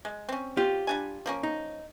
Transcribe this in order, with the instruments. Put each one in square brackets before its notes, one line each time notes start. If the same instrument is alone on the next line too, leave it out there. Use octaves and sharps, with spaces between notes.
[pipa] G#3
C4 C#4
[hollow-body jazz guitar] F4 G4
[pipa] G3 D4 G#5
F3 A#3 C#4
[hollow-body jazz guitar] D#4